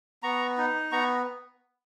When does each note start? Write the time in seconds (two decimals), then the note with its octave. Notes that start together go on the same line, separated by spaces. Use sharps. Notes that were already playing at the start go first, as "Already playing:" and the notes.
0.23 B3 A#5 C#6
0.58 D#4
0.92 B3 A#5 C#6